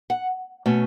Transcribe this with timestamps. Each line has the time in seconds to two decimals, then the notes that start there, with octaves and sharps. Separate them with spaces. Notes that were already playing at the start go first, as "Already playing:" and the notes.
0.10 F#5
0.66 B2 A3 C#4